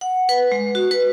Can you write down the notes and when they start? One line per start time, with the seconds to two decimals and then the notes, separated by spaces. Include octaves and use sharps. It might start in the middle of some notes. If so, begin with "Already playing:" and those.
0.01 F#5
0.29 B4
0.52 G#3
0.75 F#4
0.91 B4